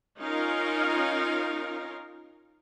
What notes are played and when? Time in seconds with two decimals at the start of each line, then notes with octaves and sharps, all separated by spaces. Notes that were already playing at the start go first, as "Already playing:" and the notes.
0.20 C#4 D#4 F4 A#4 F5